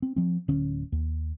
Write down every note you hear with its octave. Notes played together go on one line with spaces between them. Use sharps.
C4
F3 C4
D1 D3 C#4
D#2